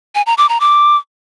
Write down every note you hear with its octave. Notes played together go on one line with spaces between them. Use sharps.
G#5
A#5
D6
A#5
D6